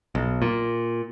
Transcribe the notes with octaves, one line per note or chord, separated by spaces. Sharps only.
B1
A#2